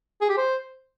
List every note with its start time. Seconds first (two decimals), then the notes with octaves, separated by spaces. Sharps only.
0.21 G#4
0.29 G4
0.37 C5